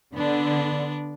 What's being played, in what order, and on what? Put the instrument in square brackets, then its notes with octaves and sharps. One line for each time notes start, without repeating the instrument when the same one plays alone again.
[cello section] D3 [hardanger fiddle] B3 D4